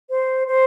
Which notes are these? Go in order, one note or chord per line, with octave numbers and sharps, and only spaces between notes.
C5
C5